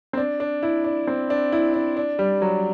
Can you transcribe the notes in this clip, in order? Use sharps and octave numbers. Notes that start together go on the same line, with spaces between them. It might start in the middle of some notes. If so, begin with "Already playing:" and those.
C4
D4
D4
E4
D4
C4
D4
E4
D4
D4
G3
F#3